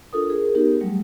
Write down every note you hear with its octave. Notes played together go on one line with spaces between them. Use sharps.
D4 F4 A4 A#4 D#6
G#4 A#4
B3 D#4 G4 A#4
F#3 G3 A3